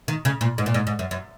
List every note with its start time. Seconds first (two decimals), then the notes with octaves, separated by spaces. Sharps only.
0.08 D#3
0.25 C#3
0.41 A#2
0.58 G#2
0.66 A#2
0.74 G#2
0.87 G#2
0.99 F#2
1.11 F#2